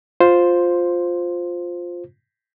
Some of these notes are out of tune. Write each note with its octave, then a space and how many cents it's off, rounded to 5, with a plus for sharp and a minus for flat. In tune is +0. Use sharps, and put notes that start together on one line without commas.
F4 +10 C5 +0